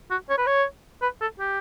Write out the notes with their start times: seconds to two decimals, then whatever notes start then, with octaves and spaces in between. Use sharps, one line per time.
0.11 F#4
0.30 C#5
0.38 B4
0.47 C#5
1.02 B4
1.21 A4
1.40 G4